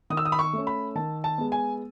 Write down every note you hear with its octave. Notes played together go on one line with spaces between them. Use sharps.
D#3 D#6
E6
D#6
B5
C#6
A3 C#4
B5
D#3 A5
A5
G#3 B3
G#5